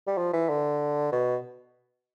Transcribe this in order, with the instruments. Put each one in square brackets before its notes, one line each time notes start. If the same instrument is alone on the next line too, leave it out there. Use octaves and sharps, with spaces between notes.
[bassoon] G3
F3
E3
D3
B2